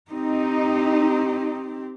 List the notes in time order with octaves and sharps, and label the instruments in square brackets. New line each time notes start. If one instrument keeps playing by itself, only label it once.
[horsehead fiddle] C4 G4 [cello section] D#4